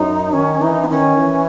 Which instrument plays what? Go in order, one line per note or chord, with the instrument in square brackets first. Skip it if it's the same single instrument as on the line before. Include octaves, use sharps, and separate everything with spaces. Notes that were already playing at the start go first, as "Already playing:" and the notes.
Already playing: [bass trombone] F#2 [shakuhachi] D#4
[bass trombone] D#3 [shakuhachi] C#4
[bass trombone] E3 [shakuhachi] D#4
[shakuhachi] B3
[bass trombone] D#3 [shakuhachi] C#4
[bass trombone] E3